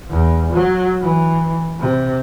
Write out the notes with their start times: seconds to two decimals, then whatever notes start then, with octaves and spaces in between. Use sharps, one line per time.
0.10 E2
0.53 F#3
1.02 E3
1.80 C3